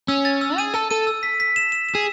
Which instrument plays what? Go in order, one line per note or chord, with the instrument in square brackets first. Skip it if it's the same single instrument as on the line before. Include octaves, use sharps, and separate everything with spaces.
[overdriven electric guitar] C#4 [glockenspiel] E6
[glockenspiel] A6
E6
[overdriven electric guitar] G#4 [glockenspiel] D#7
[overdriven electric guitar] A4 [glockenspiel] E6
[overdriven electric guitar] A4 [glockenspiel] D#7
[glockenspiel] E6
B6
B6
E7
E7
E7
[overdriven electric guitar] G#4